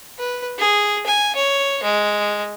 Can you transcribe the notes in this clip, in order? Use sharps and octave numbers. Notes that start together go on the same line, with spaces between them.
B4
G#4
G#5
C#5
G#3